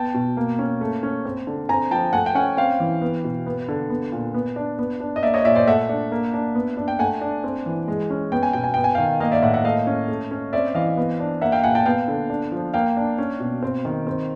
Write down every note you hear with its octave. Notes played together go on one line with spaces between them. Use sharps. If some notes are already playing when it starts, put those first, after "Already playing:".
Already playing: B3 G5 A5
B2
A#3
C#4
A3
C#4
C4
D3
C4 G#5 A#5
F3 G5 A5
A3 F#5 G#5
G5
C#4 F#5 G#5
C4 F5 G5
E3
B3
B2
B3
D3
B3
A#2
B3
D4
B3
D4
D#5
A#3 D5 E5
C#5 D#5
A#2 D5 E5
C5 D5
A3 E5 F#5
D4
A#3
D4
B3
D4
G5
A3 F#5 G#5
D4
C4
E3
G#3
C#4
B3 G5
G#5
B2 G5
G#5
B3 G5
G#5
D#3 F5 G5
A#3 D#5 F5
D5 E5
A2 E5 F#5
E5 F#5
A3 D#5 F5
C#4
A3
C#4
C4 D5 E5
E3 D#5 F5
B3
D4
A#3 E5 F#5
F5 G5
A#2 F#5 G#5
G5 A5
B3 F5 G5
D3
D4
F3
A#3 F5 G5
D4
C#4
B2
C4
D#3
C4